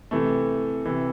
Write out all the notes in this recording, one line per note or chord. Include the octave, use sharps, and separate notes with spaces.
C3 E3 A3
C3 E3